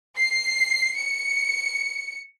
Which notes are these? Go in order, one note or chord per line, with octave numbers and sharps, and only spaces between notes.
C7
C#7